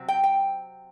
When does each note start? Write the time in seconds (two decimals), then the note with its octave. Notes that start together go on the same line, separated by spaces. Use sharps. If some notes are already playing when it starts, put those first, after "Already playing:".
Already playing: C3 F#3 C4
0.08 G5
0.24 G5